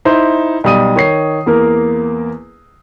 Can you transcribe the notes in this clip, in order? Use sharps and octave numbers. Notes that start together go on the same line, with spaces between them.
D#4 E4 C5
B1 G3 D#6 D#7
D#3 C#5 C7
E2 A#3 A#4